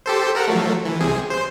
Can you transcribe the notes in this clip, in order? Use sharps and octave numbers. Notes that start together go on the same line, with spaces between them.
G4 A4 C5
A4 A#4 F#5
F3 F#3 A3
E3
C2 C3 G#4
C5